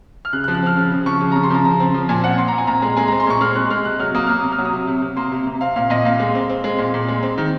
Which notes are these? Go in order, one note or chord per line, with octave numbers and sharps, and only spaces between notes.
F6
C#3 F#6
F#6
F3
F#6
C4 F6
C#3 F6
C#3
F3 C#6
C#3
C#3 A#5
C6
F3 A#5
C#3 A#5
C4
F3
A#2 G#5
C4 F#5
C4 C6
A#5
A#2
G#5
A#2 A#5
G#3
G#3 G#5
C4 A#5
C6
A#2 C#6
G#3 F6
G#3 F#6
G#3 F6
C3 F#6
F#3 F6
A#3 D#6
A#3 F6
C3 D#6
F6
F#3
D#6
C3
C3
C3
A#3 C6
C3
C3
C4 F5
A#2 F5
A#2 D#5
A#2 F5
G#3
C4
C4
G#3
A#2
A#2
G#3
C4
D#3